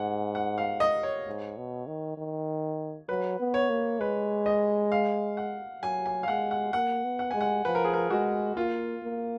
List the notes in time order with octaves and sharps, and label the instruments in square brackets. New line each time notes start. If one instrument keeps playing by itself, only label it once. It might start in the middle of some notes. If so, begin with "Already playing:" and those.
Already playing: [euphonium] G#2 [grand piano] F#5 G#5
[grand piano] F#5
F5
D#5
C#5
[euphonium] G#2
B2
D#3
D#3
[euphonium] F#3 [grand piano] B4
[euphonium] B3
[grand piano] C#5
[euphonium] A#3
[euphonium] G#3 [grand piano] B4
[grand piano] D#5
F5
F#5
[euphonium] F#3 [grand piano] G#5
[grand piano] G#5
F5
[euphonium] G#3 [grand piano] F#5
[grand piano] F#5
[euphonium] A#3 [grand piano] F#5
[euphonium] B3
[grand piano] F#5
[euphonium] G#3 [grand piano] G#5
[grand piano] F#5
[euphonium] F3 [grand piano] B4
[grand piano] A#4
G#4
A#4
[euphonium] G#3 [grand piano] F#4
[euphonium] A#3 [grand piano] F4
[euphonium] A#3